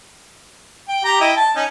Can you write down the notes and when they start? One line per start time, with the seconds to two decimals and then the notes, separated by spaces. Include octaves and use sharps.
0.88 G5
1.04 G4 A#5
1.20 E4 D#5 G5
1.36 A5
1.56 C#4 D#4